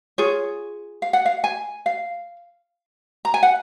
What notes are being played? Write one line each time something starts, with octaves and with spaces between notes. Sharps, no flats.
F4 G#4 C#5
F5
F#5
F5
G#5
F5
A#5
G#5
F#5